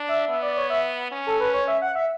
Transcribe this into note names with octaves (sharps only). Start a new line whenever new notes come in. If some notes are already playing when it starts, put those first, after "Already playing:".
Already playing: D4
E5
B3 E5
D5
C#5
E5
C#4
A4
B4
C#5
E5
F#5
E5